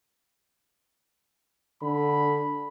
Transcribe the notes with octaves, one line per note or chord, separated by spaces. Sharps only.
D3 B5